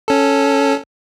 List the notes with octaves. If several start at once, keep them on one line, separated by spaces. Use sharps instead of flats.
C#4 A4